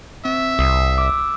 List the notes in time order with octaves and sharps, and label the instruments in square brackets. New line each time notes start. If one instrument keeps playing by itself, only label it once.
[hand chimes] C4 [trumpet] E5
[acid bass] C2 [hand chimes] D#6 C7
[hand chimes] D6 E6